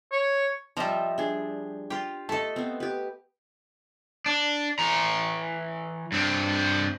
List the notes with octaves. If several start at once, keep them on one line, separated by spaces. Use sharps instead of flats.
C#5
F3 G3 D#5 E5 A#5
D4 G#4
F4 G4 G5
A3 A4 D#5 A5
B3 C4
G4 B4
D4
E3 A#5
G2 C4